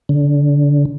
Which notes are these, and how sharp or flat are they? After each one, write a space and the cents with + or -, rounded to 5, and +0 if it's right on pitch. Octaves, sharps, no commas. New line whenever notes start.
D3 -25